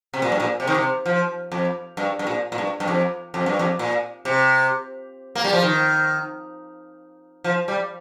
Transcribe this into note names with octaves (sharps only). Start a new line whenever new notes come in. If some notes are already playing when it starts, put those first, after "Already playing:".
C3
A#2
G2
A#2
C3
D#3
C3
F3
F2
G2
G2
A#2
A#2
G2
G2
F2
F2
G2
F2
A#2
C3
A#3
G3
F3
D#3
F3
G3